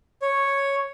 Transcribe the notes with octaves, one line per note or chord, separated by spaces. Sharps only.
C#5